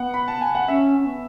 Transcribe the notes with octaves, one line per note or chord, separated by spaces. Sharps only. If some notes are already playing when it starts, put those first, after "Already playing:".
Already playing: B3 F#5
B5
A5
G#5
F#5
C#4 E5
C#4
B3